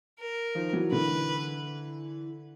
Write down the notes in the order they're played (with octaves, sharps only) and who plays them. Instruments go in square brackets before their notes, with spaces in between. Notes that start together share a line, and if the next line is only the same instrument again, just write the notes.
[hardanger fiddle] A#4
[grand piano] D#3 F3
E3 F#3
[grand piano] D3 E3 [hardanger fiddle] B4